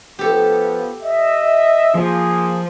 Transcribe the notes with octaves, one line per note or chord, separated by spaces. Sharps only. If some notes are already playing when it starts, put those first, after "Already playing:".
F3 B3 G4 A4
D#5 E5
F3 A#3 G#4